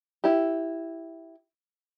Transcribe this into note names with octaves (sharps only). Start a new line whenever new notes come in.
E4 G4